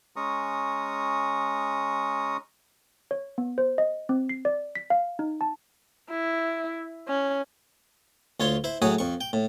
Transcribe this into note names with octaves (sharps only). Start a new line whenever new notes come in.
G#3 C#4 A#5 C#6 D#6
C#5
B3
C5
D#5
C4
C7
D5
B6
F5
D#4
A5
E4
C#4
D2 F4 C#5 C6
E4 C5
A2 F#3 F#4 G#4 D#6
F2 C#6
G5
A2